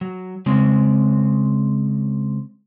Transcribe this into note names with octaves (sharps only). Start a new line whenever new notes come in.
F#3
C#3 G#3 C4